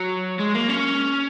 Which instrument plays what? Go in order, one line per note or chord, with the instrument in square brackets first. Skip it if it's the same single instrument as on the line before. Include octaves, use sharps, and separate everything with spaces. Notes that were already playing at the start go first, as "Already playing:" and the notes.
Already playing: [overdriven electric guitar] F#3
G#3
A#3
C#4